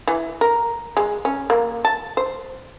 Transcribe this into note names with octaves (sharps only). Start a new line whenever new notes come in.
E3
A#4
G#3
C#4
A#3
A5
C5